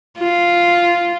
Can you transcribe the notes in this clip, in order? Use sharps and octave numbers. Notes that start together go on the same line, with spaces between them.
F4